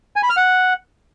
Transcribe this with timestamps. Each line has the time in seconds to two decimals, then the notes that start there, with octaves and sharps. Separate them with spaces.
0.16 G#5
0.23 B5
0.30 F6
0.37 F#5